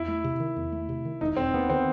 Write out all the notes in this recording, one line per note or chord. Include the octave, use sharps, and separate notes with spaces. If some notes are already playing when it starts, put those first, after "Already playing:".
Already playing: E2 E4
A3
C3
D#3
E2
A3
C3
D#3
E1 D#4
E1 C4
D#2 B3
D#3 C4